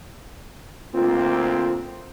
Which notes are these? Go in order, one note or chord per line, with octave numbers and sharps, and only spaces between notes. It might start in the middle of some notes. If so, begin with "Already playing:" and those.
D2 A#3 C4 F4